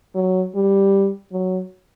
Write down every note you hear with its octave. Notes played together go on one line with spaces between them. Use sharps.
F#3
G3
F#3